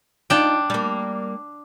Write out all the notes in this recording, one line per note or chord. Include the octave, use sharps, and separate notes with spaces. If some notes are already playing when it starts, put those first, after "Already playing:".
D4 D#4 F4 G5
G3 A#3